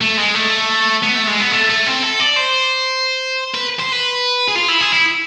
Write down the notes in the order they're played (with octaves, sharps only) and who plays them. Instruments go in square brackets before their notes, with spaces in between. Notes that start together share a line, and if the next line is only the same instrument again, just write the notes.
[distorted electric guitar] A3
G#3
A3
B3
A3
G#3
B3
A3
A3
C4
A4
D5
C5
B4
C5
B4
G#4
F4
E4
G#4
E4